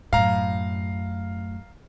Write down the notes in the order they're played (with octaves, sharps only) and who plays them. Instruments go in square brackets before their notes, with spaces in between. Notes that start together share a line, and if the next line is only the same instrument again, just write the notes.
[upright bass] F#2 A2 [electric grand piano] F5 A#5